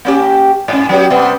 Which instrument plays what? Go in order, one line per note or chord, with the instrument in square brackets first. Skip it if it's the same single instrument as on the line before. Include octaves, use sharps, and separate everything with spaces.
[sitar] A#3 C#4 G4
G#2 C#4
F#3 B3 G4
C3 G3 B3